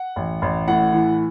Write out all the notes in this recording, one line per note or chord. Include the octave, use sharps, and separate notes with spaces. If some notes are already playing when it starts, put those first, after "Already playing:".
Already playing: F#5
A1
A1
A2 F#5
E3